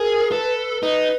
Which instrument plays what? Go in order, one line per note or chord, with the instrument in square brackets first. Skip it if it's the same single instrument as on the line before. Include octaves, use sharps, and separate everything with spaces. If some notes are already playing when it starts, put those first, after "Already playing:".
Already playing: [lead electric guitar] G#4 [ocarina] A#4
[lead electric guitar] A4 [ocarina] B4
[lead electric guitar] D#4 [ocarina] B4